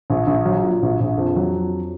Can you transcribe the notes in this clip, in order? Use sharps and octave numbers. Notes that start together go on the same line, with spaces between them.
A#1
A#1
F#3
A#2
A#1
A#1
F2
F#3
F2